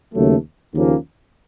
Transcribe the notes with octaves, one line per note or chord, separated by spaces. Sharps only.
D#2 C#3 F#3 A3
D#2 C#3 F3 A#3 C#4